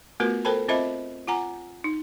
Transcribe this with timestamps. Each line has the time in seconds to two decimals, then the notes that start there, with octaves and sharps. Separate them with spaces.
0.20 A3 B3 F4 F#4 A#4 B4
0.45 A4 A#4 C5 G5 A5 B5
0.68 C4 F4 C5 D#5 E5 B5
1.27 F4 F#5 G#5 A#5
1.84 D#4